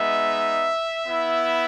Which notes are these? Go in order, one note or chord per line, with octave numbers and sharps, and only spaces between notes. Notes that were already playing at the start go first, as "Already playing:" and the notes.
Already playing: G#3 B3 D#4 E5
B3 E4